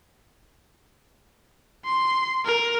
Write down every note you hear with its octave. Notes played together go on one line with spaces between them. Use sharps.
C6
A#4